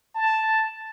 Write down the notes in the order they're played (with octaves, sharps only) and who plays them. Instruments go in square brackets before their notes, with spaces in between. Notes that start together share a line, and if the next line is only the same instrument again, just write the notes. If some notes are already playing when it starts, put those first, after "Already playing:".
[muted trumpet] A5